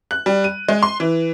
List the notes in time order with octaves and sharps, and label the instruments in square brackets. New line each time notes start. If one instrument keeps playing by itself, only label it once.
[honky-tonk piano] F#6
G3
D#7
G#3
C6
E3